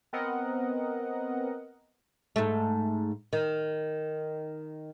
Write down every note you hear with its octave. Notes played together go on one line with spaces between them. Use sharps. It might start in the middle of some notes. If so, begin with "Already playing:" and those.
B3 C4 A#4 D#5 F#5
G#2 A3
D#3